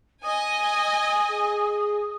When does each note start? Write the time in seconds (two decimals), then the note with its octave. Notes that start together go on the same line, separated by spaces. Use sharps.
0.24 D#5 G#5 D#6
1.31 G#4